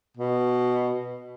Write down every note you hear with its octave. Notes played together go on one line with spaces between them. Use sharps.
B2